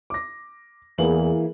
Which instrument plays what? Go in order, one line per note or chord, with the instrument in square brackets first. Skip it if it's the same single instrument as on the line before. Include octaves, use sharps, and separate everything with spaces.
[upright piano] D6 A#6
[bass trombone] E2 [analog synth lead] E3 [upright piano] A#3 G#4 F#7